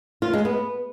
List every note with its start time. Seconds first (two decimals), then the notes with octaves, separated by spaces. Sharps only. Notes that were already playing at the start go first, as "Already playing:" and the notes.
0.22 F4
0.33 G#3
0.45 B3